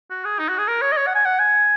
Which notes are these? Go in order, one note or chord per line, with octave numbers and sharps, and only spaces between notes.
F#4
G#4
D#4
F#4
G#4
A#4
C#5
D#5
C#5
F#5
G#5
F#5
G#5